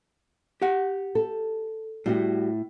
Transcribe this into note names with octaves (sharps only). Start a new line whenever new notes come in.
G4 F#5
A4
A2 G3 F#4 G4